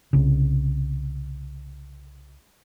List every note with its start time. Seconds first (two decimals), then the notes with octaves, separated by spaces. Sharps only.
0.13 C2 C#3